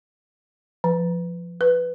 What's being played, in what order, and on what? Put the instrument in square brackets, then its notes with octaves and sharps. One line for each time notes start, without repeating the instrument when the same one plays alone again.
[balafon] F3
B4